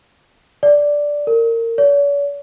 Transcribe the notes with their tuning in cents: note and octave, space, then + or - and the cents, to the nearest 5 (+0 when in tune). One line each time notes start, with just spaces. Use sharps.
D5 -5
A#4 -25
C#5 +45